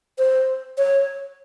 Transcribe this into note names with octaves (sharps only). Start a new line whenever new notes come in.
C5
C#5